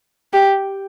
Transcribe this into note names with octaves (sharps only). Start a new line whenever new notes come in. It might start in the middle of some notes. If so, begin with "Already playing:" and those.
G4